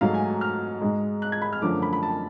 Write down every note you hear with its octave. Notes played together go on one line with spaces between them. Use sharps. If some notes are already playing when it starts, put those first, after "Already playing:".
G#2 F#3 A3 F5
G#5
F6
G#2 G#3
F#6
G#6
B5
F6
F#2 D3 F3 A3 D6
B5
B5
A5